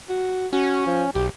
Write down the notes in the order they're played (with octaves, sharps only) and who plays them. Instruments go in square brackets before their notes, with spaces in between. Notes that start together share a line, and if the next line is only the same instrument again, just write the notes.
[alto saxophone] F#4
[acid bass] C#4 [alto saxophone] F#4
[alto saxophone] F3
[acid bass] B1 [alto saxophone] G4